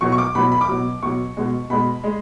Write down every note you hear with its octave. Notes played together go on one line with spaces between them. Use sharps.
B2 F#3 C#6
C#6
D6
B2 F#3 B5
B5
D6
B2 F#3
B2 F#3 C#6
B2 G#3
B2 G#3 B5
G#3